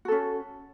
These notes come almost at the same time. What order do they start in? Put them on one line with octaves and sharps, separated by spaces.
F#4 A4 C#4